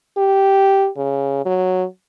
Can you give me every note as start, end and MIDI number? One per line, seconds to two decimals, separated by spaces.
0.18 0.88 67
0.97 1.43 49
1.45 1.84 54